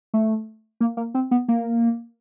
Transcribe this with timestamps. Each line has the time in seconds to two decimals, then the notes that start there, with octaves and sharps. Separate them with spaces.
0.14 A3
0.81 A#3
0.97 A#3
1.14 C4
1.31 B3
1.48 A#3